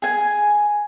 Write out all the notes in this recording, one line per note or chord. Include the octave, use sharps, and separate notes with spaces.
G#4 G#5